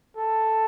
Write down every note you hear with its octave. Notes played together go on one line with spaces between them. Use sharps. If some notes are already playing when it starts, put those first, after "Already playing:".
A4